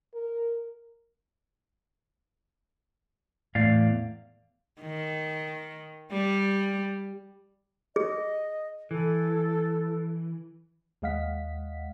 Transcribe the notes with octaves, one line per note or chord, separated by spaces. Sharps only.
A#4
E2 A2 D5 F5
D#3
G3
G#4 D#5
E3 A4
D#2 G#3 D#5 F5 F#5 B6